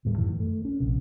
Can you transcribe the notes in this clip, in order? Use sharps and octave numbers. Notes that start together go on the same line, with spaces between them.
D2 A2 G3 A3
F#2 A2 D#3 E3
A3
C#4
A#1 C3